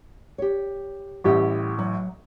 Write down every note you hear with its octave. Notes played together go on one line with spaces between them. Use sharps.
G4 C#5
A1 A2 G3 G4 F#5
F#3